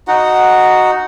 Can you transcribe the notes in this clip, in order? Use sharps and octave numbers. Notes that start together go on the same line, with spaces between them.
D#4 F#4 F#5